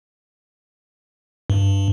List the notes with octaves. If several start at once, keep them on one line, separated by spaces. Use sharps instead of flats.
G2